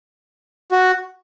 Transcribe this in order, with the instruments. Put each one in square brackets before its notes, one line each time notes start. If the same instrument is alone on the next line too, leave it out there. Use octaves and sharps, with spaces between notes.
[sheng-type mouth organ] F#4